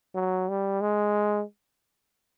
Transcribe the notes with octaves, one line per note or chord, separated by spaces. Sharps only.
F#3
G3
G#3